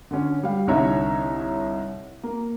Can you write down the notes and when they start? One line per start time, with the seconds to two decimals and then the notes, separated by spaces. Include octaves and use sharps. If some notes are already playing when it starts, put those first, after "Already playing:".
0.11 D3 C#4
0.43 G3 F5
0.67 C2 D3 D#4 C#5 E5 A#5
2.23 A#3